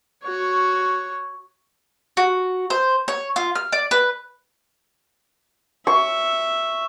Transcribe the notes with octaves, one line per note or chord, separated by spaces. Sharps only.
F#4 C#5
F#4
C5
C#5
F4
F6
D5
B4
E5 C#6